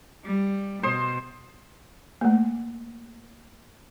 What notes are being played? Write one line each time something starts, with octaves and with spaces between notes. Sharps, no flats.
G3
B2 C5 D#6
A3 A#3